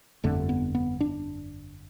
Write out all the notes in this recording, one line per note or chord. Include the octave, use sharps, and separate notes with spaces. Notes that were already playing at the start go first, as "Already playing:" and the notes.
G1 F2 D3 A3
B3
B3
D4